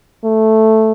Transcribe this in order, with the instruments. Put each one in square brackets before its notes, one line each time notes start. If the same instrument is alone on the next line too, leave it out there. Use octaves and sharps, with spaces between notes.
[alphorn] A3